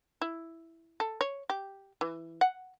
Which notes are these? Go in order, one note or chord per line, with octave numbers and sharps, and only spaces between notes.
E4
A4
C#5
G4
E3
F#5